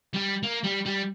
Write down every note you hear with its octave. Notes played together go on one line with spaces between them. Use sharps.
G3
A#3
G3
G3